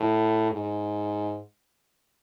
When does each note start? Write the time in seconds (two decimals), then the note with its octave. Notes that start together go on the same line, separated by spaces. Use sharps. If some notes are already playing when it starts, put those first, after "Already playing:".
Already playing: A2
0.50 G#2